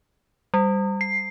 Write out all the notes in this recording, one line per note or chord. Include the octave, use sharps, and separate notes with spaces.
G3
C7